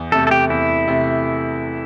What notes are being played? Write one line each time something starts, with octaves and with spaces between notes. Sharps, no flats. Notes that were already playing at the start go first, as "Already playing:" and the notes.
Already playing: E2
C3 A3 A4
A4
G4
E2 E4
C3 A3